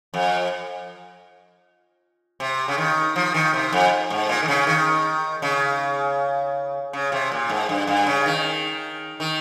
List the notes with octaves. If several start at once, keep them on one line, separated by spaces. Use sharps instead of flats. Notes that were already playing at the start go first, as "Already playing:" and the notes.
F2
C3
C#3
D#3
F3
D#3
C3
F2
G#2
A#2
D#3
C#3
D#3
C#3
C#3
C3
A#2
G#2
G2
G2
C#3
D#3
D#3